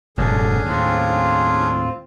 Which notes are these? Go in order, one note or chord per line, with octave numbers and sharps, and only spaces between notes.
F1 G2 A#2 D3 C#4 D4 G#4
D#2 A2 C4 F4